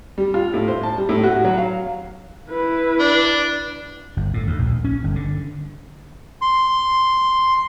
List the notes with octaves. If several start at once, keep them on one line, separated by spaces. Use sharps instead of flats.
G3
F4
A2
C5
A5
G3
A2
F#4
F#3
F5
E4 B4
D4
G1
A2
D2
A#1
C#4
G1
D3
C6